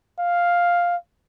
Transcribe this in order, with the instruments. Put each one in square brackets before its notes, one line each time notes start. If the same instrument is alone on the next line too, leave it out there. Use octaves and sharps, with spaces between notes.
[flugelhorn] F5